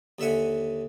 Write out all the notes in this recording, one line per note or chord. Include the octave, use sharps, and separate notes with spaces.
D#2 D3 E5 F#5 G#5